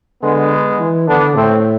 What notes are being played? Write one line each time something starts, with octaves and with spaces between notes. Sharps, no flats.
D3 G#3 B3
E3
D3 B3 D4
A2 A3 C4